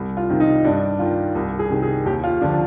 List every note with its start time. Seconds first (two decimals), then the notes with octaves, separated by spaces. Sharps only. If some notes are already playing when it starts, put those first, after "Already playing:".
Already playing: C2
0.17 F4
0.29 C3 D#3
0.40 D#4
0.65 G2 D4
0.99 D#3 F4
1.35 C2
1.59 G#4
1.70 C3 D#3
1.83 G#4
2.06 D#2 G4
2.24 F4
2.41 D3 F3 D4